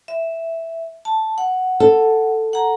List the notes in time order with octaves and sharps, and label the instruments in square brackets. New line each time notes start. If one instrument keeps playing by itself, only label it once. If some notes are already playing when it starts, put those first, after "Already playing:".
[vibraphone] E5
A5
F#5
[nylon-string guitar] A4
[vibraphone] F#5 A#5